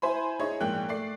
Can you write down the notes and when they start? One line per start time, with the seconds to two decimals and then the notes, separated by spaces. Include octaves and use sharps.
0.02 E4 C5 G#5 B5
0.39 D#4 E4 G#4 C#5
0.60 A#1 G#2 A#3 G5 F#6
0.89 A3 D5 C7